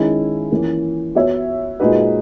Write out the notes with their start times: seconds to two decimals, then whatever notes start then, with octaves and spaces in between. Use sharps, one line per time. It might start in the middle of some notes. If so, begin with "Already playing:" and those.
Already playing: D#3 G#3 C#4 E4
0.51 E3 A#3 C#4
1.15 B3 F#4 C#5 E5
1.80 A#2 G#3 D#4 F#4 B4